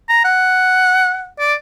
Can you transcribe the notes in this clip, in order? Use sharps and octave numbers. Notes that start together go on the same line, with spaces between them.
A#5
F#5
D5